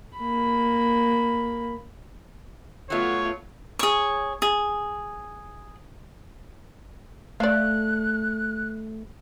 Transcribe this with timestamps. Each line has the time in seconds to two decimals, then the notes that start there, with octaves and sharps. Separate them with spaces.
0.18 A#3 B5
2.90 F#3 A3 B3 F4 C#5
3.79 G#4 C#5
4.42 G#4
7.40 A3 D5 F5 F#6